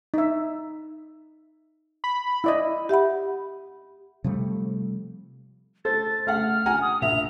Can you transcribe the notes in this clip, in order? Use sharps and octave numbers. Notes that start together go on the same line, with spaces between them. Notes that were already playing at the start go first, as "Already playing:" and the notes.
D#4 E5
B5
E4 D5 D#5
G4 E5 F#5 B5
C3 F3 G3 A3
A4 C5 A6
A3 F5 F#5 F6
F#5 G#5 A#5
D#6
A#1 E5 F7